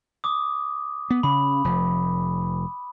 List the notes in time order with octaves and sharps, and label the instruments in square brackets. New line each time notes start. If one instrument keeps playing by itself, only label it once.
[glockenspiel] D6 D#6
[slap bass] B3
[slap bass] C#3 [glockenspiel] B5
[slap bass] F1 F3